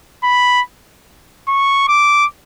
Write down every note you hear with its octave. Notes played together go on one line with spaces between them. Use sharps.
B5
C#6
D6